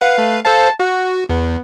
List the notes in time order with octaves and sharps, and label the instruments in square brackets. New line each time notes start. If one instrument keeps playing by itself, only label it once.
[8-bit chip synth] B4 F5 [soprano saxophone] F#5
[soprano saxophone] A3
[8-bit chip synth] A4 C5 F5 [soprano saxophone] A5
[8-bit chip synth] F#4 [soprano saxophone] F#5
[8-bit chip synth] E2 [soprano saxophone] B3